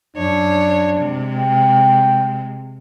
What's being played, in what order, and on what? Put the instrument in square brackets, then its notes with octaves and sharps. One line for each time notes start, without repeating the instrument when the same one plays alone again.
[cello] F#2 C#5 [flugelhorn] D4
[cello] C3 G#3
[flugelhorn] G5